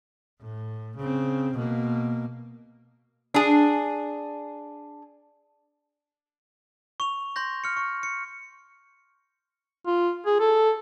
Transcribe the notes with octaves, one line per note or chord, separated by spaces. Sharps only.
A2
C#3 C4
B2 A#3
D4 G#4
C#6 F7
C6 G6 A#6
F6 C#7
C#6
C#7
F4
G#4
A4